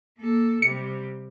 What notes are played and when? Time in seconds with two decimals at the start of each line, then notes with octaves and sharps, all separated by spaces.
0.19 A#3 A4
0.62 C3 G3 C#7